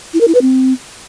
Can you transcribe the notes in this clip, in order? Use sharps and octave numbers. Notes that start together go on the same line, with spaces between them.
E4
A#4
E4
B4
C4